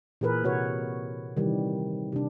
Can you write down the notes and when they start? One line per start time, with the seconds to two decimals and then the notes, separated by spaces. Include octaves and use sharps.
0.21 A#2 E3 G#4 A#4 B4
0.44 C3 F#4 B4 C#5
1.37 C3 D#3 E3 G3
2.12 C3 D4